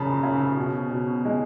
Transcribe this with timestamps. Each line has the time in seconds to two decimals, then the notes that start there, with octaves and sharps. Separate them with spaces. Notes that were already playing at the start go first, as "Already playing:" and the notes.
Already playing: F#2 C#3 A5 B5
0.23 C#3
0.57 B2
0.91 B2
1.25 G#3